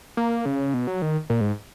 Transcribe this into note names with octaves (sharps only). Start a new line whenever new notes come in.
A#3
C#3
B2
F#3
D#3
A#2
G#2